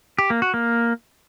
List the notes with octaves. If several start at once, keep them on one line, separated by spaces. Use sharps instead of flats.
G4
A#3
F#4
A#3